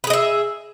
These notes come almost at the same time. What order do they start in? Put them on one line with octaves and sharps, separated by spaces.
B4 G#4 D#5 E5